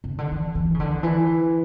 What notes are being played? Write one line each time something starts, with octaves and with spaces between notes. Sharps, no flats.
C#3
D3
E3
E3
C#3
D3
E3